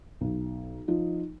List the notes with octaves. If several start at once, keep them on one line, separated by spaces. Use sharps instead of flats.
B1
F3 D#4 F4